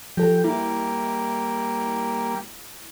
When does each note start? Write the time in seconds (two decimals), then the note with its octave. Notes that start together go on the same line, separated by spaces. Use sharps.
0.17 F3 G4 A4
0.44 G3 A#3 E4